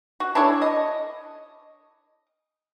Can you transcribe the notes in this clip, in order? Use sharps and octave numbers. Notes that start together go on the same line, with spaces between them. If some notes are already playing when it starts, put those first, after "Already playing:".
F#4
D4 E4 A4 C#5
D#5